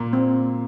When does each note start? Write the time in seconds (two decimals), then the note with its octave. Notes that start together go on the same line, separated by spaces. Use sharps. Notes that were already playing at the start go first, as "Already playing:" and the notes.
Already playing: A#2 A#3
0.13 C4